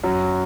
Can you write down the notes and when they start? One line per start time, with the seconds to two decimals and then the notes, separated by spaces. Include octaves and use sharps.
0.03 F#2 F#3